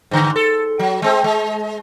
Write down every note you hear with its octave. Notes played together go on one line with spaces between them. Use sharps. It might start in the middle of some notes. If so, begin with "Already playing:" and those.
G#2 D3
A4
F#3
G#3 C4
G#3